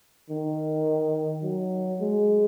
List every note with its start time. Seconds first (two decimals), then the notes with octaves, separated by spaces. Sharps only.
0.30 D#3
1.43 F#3
2.00 G#3